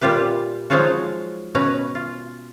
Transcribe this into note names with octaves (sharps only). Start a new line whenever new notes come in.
A#2 G3 F4 G4 B4
F3 F#3 G#3 D#4 F4 F#4
B2 C#4 B4 A#5
F4